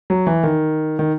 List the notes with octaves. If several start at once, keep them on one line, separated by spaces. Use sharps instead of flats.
F#3
E3
D#3
D#3